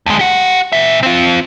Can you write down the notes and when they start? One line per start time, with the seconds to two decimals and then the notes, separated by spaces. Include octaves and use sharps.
0.06 D2 G#3
0.19 G4 F#5
0.73 A#2 E5
1.03 C4 F4